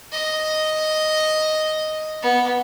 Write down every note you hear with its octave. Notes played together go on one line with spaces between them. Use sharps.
D#5
B3